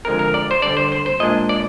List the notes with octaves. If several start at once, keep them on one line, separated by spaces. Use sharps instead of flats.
D3 F3 G#3 C4 A#4
A#4
D5
C5
D3 G3 D4 D5
C5
C5
C5
A#2 G#3 D4 D#5
D5